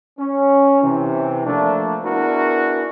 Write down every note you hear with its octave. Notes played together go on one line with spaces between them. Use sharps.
C#4
C3 E3
F3 A3 A#3 D4
B3 D4 E4 F#4 G#4 A#4